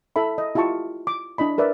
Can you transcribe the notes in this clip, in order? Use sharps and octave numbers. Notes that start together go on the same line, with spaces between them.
E4 A4 E5 B5
D#5
E4 F4 G4 A5 C#6
D6
D4 E4 D#5 B5
A#4 B4 D5 E5